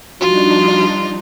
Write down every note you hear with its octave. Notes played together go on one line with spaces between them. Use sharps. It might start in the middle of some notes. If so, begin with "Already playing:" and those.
F3 G3 D4 D#4 F4 F#4